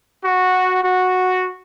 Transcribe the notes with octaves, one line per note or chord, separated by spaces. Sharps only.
F#4
F#4